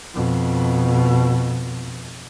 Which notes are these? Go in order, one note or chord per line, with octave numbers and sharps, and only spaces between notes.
F2 B2